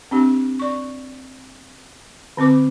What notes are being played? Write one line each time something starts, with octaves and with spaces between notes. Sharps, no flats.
C4 D4 G4
D5 C#6
D3 C4 B4 D6